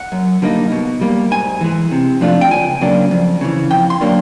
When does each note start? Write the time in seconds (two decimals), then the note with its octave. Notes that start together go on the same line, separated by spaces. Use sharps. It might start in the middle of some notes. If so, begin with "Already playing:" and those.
Already playing: F#5
0.12 F#2
0.42 D3 G3 A#3 D#4
0.72 B2
1.01 G3 A#3
1.31 G#2 G#5
1.61 E3 G#3
1.91 C3
2.21 F3 A3 D4 F4
2.41 G5
2.51 C#2 G#5
2.81 C#3 F#3 A#3 D4
3.11 F2
3.41 C#3 E3
3.70 F2 G5
3.90 C6
4.01 D3 F#3 A#3 D4